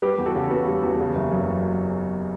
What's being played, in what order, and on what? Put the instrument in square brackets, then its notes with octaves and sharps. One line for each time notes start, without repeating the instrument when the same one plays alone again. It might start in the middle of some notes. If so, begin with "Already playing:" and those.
[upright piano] G3 G4 B4
E2
F#4 A4
C#3
B3 F#4
G3
E2
C#3
F#1
F#2